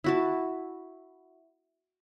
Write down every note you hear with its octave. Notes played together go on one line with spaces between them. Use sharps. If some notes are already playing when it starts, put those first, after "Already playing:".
E4 F#4 A5